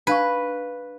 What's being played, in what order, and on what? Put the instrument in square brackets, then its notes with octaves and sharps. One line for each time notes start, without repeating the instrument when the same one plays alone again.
[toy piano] D4 F5 C#6 [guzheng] B4